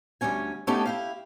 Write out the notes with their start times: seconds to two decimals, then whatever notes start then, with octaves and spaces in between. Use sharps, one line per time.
0.21 D2 G#2 G3 C#4 G#5
0.67 A3 B3 C#4 D#4 G4 A4
0.86 E4 G4 F5